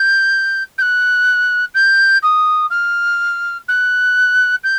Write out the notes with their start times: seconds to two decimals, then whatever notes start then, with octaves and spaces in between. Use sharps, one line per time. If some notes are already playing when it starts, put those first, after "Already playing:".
Already playing: G6
0.78 G6
0.82 F#6
1.74 G6
2.23 D#6
2.70 F6
3.68 F#6
4.64 G6